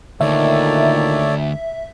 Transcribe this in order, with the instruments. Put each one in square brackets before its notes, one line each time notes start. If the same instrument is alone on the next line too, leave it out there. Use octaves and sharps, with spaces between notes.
[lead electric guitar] D2 [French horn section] A#2 D#3 [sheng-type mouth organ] A4 C#5 D5 [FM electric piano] E5